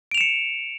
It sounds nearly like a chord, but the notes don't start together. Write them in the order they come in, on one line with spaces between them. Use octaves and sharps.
D7 F7 E7 C#7